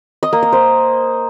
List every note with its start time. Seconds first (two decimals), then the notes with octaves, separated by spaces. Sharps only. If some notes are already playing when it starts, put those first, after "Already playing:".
0.23 D#5
0.33 A#3
0.43 D#5
0.53 C5